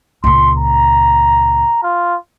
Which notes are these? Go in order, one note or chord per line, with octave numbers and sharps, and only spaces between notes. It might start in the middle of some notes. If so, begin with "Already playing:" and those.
C#2 A#2 C6
A#5
F4